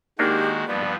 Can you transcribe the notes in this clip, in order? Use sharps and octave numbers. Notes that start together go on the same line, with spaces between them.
D#3 G#3 A#3 D4 D#4 F#4 G4
G2 F3 B3 D5